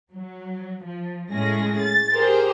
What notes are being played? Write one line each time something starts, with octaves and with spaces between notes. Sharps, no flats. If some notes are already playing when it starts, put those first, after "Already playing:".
F#3
F3
A2 G#3 C#4 G#4 A#6
A6
G4 G#4 A#4 C5